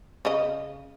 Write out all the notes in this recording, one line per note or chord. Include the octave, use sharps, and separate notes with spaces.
C#3 D#5